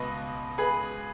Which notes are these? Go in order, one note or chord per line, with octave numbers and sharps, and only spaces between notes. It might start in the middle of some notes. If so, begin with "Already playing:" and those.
Already playing: C#2 B2 B4 D#5
G#4 B4